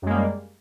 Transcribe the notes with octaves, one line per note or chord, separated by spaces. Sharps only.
F#2 G3 G#3 A#3